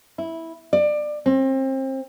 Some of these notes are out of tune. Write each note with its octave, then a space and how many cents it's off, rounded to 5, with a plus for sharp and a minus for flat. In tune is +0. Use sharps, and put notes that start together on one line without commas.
E4 -10
D5 +25
C4 +30